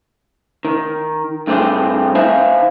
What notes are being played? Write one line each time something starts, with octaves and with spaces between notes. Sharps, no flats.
D#3
G2 A3 C4 G4 G#4
D#4 C5 E5 F5 G#5